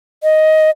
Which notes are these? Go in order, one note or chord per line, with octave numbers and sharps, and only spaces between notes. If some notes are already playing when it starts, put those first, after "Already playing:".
D#5